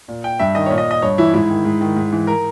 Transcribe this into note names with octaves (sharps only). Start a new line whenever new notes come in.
A#2
G5
G2 E5
D#3 D#5
A#2 C#5
D#5
D#5
G2 C#5
E3 E4
G#2 E4
D#3
G#2
D#3
G#2
E3
A#4